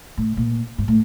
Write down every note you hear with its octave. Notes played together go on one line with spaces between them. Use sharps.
A2
A#2
G#2
A2